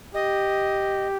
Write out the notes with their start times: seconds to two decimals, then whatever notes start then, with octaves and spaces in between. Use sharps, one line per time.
0.14 G4 D#5